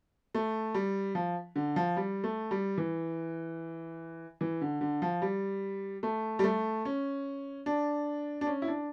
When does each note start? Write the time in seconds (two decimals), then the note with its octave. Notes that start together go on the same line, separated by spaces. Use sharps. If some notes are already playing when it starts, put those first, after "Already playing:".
0.35 A3
0.74 G3
1.15 F3
1.56 D3
1.76 F3
1.97 G3
2.24 A3
2.51 G3
2.78 E3
4.41 E3
4.61 D3
4.81 D3
5.02 F3
5.22 G3
6.03 A3
6.39 G3
6.44 A3
6.85 C#4
7.66 D4
8.41 D4
8.47 C#4
8.62 E4
8.68 D4